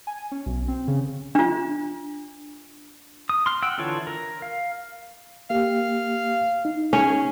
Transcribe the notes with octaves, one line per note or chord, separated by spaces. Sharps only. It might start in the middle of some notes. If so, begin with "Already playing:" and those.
G#5
C#4
B1
C4
C#3
D4 F4
D#6
C6 F6
F#5 G5 E6
D3 E3 F4 A4 C#5
A#4
F5
A#3 G4 F5
D#4
C#4 G#4